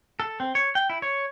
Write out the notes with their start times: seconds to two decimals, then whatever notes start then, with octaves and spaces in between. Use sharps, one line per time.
0.20 A4
0.40 C4
0.55 C#5
0.75 G5
0.90 E4
1.02 C#5